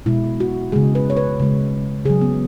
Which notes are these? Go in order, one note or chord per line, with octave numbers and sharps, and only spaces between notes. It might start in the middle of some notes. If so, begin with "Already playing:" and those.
B2 G#3 E4
F#4
C#3 G#3 G#4
B4
C#5
B4
C#3 G#3
C#3 F#3 G#4
B3